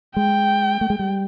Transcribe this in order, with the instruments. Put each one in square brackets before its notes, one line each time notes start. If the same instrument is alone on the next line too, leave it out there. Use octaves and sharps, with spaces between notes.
[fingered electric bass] G#3 [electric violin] G5
[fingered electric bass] A3
G#3
G3